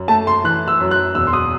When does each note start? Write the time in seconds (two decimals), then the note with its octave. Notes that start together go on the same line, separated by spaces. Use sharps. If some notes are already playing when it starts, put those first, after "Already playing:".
Already playing: F#2
0.08 A3 A5
0.27 C6
0.44 E3 F#6
0.68 E6
0.80 F#2
0.91 F#6
1.15 E1 E6
1.27 C6
1.33 D#6